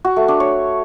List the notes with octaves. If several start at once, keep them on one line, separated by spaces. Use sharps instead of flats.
F#4
A3
D4
C#5